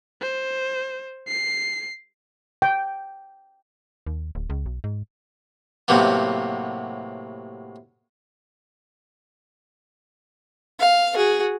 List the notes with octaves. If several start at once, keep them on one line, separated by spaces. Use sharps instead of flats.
C5
C7
G5
D#2
D1
C#2
B1
G#2
A2 C3 F#3 A#3 B3
F5
F#4 G#4